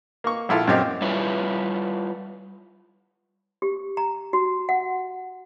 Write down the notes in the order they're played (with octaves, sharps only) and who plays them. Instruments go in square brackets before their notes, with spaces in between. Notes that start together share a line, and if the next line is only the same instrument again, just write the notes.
[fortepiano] A#3 C#6
A#1 E4 F4 A4
F#2 A#3 C4 G4 D#5 F6
[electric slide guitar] G3 E4 F4 B4 C#5 E5
[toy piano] G4
A#5
F#4
F#5